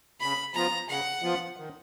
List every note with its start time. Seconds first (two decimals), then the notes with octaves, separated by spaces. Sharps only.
0.20 C#3 B5
0.54 F3 B3 F4 A#5
0.88 C#3 F#5
1.22 F3 B3 F4
1.57 D#3